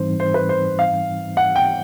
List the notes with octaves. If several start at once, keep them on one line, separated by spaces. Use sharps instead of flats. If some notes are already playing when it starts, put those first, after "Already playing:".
Already playing: G#2 E3 G3 C4 D#4 C5
C5
B4
C5
F5
F#5
G5